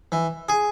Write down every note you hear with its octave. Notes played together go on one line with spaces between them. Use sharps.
E3
G#4